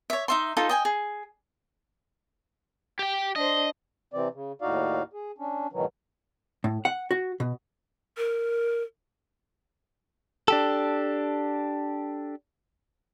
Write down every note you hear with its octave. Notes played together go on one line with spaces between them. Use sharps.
C#5 E5
D#4 E5 C6
D#4 F4 A4
D#5 G5 G#5
G#4
G4 G5
D4 C5 D#5
C3 E3 C4 D5
C#3
D#2 A2 D#4 F#4 D5 F5
G#4
C#4 D4
G#2 B2 D#3 E3 F#3
A2
F#5
F#4
B2
A#4
D4 G4 A4